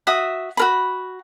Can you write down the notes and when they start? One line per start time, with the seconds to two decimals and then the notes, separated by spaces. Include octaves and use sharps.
0.07 F#4 E5 D#6
0.57 F#4 A#4 B5